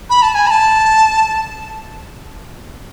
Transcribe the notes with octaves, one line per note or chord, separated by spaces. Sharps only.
B5
A5
G#5
B5
A5